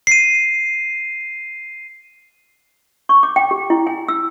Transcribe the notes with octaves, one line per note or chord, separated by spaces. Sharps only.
C7 D#7
C#6
D6
G5
G4
E4
G#5
E6